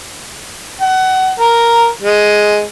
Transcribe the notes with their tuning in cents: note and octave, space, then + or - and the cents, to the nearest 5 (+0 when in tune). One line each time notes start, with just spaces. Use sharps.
F#5 +25
A#4 +0
G#3 +5